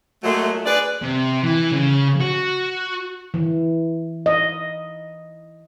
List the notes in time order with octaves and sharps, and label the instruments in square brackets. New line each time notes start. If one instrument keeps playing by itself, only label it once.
[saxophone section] A#2 F#3 G#3 A3
G#4 B4 D5
[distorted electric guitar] C3
E3
C#3
F#4
[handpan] E3
D#5